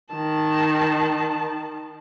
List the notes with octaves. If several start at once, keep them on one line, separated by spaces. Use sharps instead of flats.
D#3 A5